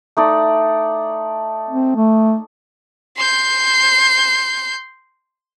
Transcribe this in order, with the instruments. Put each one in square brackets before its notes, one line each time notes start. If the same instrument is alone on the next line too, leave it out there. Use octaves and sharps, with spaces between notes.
[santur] A3 D#4 D5
[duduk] C4
A3
[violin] C6 G6